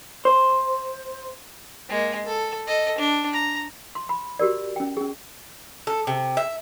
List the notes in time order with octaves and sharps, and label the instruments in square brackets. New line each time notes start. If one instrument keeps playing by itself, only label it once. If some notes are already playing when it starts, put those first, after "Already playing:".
[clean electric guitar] C5
[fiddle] G#3 A#3
A4
A4 D#5
D4
A#5
[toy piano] C6
B5
F#4 G4 A#4 D5
C#4 G5
C#4 G#4
[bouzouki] A4
C3
E5